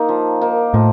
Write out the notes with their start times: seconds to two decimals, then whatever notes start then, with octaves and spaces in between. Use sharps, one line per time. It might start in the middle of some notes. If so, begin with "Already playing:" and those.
Already playing: A#3 D#4
0.09 F3
0.42 A#3 D#4
0.74 A2 F3